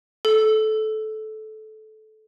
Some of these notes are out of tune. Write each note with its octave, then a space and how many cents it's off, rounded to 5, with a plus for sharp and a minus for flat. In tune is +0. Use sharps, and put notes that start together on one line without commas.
A4 -20